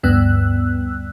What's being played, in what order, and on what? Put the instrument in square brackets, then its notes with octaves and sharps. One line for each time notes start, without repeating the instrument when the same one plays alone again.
[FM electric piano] D2 G2 B3 E6 F#6